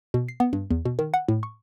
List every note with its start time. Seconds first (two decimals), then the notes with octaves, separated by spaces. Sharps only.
0.14 B2
0.28 C7
0.40 B3
0.53 G2
0.71 E2
0.85 B2
0.99 D#3
1.14 F#5
1.28 A2
1.43 C#6